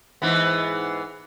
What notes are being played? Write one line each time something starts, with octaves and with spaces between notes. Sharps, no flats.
G#2 E3 B3